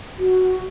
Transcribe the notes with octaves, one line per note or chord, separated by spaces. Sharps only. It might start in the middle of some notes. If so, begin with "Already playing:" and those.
F#4